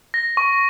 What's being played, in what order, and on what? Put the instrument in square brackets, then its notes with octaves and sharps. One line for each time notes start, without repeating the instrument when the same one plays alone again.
[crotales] A#6
C#6